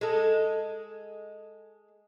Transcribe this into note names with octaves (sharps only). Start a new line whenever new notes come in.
G#3 A4